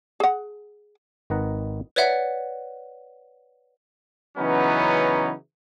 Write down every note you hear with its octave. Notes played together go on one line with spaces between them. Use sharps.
G#4 F#5
G#1 D#3 B4 D#5 F#5 A#5
B4 C#5 D5 E5 F#5
C#3 E3 F#3 B3 C#4 D#4